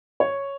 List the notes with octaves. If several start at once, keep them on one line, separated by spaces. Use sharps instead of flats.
C#5